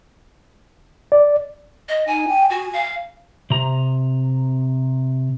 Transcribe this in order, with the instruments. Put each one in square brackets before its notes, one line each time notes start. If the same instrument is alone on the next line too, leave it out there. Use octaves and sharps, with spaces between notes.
[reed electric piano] D5
[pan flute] D#5
[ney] D#4 [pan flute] G#5
[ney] G5
[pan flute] F#4 [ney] G#5
[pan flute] F5
[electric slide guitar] C3 A#5